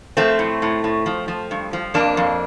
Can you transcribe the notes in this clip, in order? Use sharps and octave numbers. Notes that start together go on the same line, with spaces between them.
F3 A3 C4
A2
A2
A2
F3
F3
G2
F3
F2 A#3 D4
F2